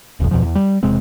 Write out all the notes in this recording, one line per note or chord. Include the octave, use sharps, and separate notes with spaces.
E1 B1 F2
E2 B2 F3
E2
G3
E1 C3 G#3 C4